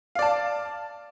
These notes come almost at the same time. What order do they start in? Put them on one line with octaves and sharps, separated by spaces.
F5 D5 A5